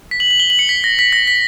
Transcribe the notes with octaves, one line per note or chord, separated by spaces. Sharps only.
B6
F#7
F#7
G7
F#7
C#7
B6
A#6
B6
A#6
B6